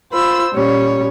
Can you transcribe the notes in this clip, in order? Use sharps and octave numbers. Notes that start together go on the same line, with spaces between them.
F4 C5 B5 E6
A#2 G3 C#4 C#5